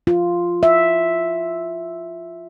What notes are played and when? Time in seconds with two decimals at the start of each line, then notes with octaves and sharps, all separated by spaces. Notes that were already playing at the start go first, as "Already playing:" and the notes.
0.07 F4
0.63 E5